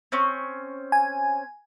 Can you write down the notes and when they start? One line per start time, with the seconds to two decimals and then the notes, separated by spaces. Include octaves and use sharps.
0.12 C4 C#4 C#6
0.92 G#5